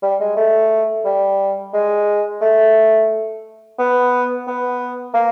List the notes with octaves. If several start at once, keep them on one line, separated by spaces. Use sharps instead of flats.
G3
G#3
A3
G3
G#3
A3
B3
B3
A#3